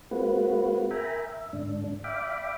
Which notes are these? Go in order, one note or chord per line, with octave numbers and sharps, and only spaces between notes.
G#3 A#3 C4 F4 F#4 B4
A#4 E5 G5 G#5 A#5 B5
E5
G#2 D3 D4
D5 E5 F5 G5 B5 D6